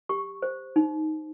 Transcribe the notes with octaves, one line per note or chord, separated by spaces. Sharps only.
G4 C#6
C5
D#4